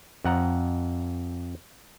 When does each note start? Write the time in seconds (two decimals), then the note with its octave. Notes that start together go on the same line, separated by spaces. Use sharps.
0.25 F2 F#5 A#5